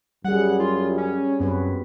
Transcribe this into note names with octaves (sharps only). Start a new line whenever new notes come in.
F#2 G3 G#4 F#5
F4
C#4
F#2 B3 C4 F#4 B4